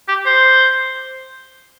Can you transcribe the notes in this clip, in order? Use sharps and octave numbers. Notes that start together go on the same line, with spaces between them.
G4
C5